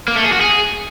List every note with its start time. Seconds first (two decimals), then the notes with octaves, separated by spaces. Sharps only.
0.08 A#3
0.16 A3
0.24 G#4
0.33 F#4
0.41 G#4